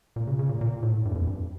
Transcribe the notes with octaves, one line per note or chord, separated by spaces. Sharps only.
A#2
C#3
C#3
A#2
A#2
A2
G2
E2
F2
G2